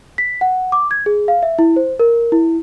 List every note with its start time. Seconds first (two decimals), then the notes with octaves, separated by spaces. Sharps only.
0.18 B6
0.41 F#5
0.72 D6
0.91 G#6
1.06 G#4
1.28 F5
1.43 E5
1.59 E4
1.76 C5
1.99 A#4
2.32 E4